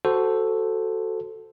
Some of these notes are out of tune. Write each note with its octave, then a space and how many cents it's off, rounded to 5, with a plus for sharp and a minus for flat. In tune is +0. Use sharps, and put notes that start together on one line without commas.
F#4 +5 A4 +0 C5 -10